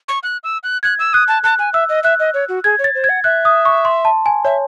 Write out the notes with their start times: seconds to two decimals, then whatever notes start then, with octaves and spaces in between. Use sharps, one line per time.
0.08 C#6
0.23 F#6
0.44 E6
0.64 F#6
0.83 F#6 G#6
0.99 E6
1.13 D#6 F#6
1.28 A5
1.44 A5 F#6
1.59 G#5
1.74 E5 E6
1.89 D#5
2.04 E5 F#6
2.20 D#5
2.34 C#5
2.49 F#4
2.64 G#4 G#6
2.79 C#5
2.84 A6
2.95 C5
3.04 G#6
3.09 F#5
3.24 E5 F#6
3.45 D#6
3.65 C#6
3.85 C6
4.05 A5
4.26 G#5
4.45 C#5 E5